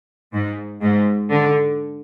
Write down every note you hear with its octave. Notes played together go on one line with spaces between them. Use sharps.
G#2
G#2
D3